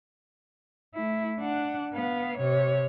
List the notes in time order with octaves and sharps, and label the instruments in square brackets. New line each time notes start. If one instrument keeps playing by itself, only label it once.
[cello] A3 E4
D4 F#5
B3 F5
C3 C#5